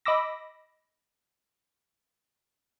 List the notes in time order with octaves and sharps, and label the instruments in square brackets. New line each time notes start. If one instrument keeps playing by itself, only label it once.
[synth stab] D#5 B5 D6 E6 A#6